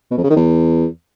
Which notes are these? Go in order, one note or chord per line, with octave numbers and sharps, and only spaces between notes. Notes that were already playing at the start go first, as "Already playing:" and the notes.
B2
F2
C#3
D#3
E2